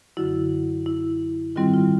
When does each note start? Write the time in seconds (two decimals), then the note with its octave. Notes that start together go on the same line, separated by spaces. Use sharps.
0.17 F#2 D3 F#3 E4 F#4
0.86 E4
1.56 G#2 D#3 G3 C4 E4 F4
1.74 F4